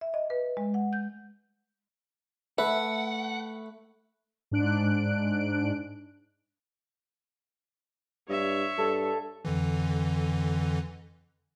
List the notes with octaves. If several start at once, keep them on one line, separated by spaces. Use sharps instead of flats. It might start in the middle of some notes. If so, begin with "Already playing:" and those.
E5
D#5
B4
G#3
F#5
G6
A3 B4 E5 F#5
G#2 D4 F#6 D7
G2 C#5 E5
G2 A4
F2 D3 E3